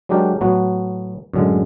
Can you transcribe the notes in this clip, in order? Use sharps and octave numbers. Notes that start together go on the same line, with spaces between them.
F#3 G#3 D4 F#4 G4 A#4
A2 F#3 A3 B3 F#4
F#2 A2 D3 G#3